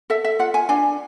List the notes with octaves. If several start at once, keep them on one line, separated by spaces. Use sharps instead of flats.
A4 E5
E5
F4 F#5
G#5
D4 G#5